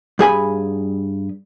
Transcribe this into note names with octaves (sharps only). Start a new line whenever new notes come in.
G2 G#4 G#5 B5